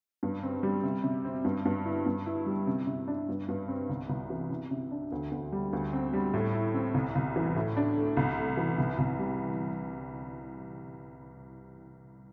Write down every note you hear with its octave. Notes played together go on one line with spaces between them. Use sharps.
G2
C4
G3
C3
C3
C4
G2
G2
E4
G2
E4
G3
C3
C3
D4
G2
G2
C4
C2
C2
E3
C3
C3
D4
D2
D2
G3
D2
C4
G3
A2
E4
C4
C2
C2
E3
A2
D4
A3
C2
A3
E3
C2
C2
G3